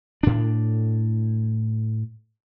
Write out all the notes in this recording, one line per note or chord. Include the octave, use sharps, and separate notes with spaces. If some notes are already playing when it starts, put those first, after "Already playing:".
A2 D4